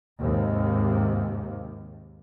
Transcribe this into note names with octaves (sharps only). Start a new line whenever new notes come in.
D#2 G#2 C3